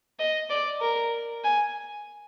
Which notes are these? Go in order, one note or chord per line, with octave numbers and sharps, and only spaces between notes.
D#5
D5
A#4
G#5